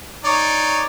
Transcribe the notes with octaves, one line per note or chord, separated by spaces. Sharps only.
D#4 C#5 D5